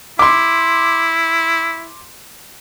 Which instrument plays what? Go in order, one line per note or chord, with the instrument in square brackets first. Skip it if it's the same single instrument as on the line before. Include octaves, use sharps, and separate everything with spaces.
[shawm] E4 [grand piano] C6 D6